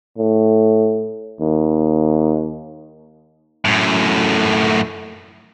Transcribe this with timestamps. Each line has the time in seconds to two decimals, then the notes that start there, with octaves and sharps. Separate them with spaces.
0.18 A2
1.41 D#2
3.65 F#2 A2